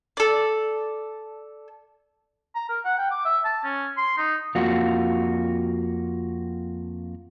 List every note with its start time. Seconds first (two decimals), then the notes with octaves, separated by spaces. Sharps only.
0.17 A4 D5
2.55 A#5
2.69 A#4
2.85 F#5
2.98 G5
3.11 D6
3.25 E5
3.44 A5
3.64 C#4
3.97 C6
4.17 D#4
4.55 F2 A#3 F4 F#4